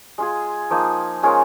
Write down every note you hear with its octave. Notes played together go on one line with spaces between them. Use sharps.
G#3 F4 G#4
F3 A#3 D#4
G#3 C#4 F4 A#4